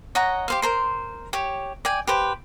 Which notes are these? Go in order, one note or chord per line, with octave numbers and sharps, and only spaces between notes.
C#5 D#5 F#5 A#5
G4 C5 F5
A#4 C5 C6
G4 C#5
D5 G5 G#5
G4 B4 C5